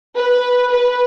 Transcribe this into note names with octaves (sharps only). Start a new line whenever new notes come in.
B4
B4